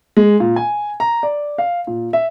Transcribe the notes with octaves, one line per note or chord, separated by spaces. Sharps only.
G#3
A#2
G#5
A#5
D5
F5
A#2
E5